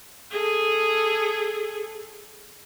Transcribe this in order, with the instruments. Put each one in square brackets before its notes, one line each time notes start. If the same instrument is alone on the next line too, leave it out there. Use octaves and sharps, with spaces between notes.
[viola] G#4 A4